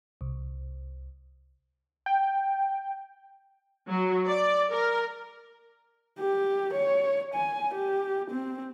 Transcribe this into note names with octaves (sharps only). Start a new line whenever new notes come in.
C2
G5
F#3
D5
A#4
G4
C#5
G#5
G4
C4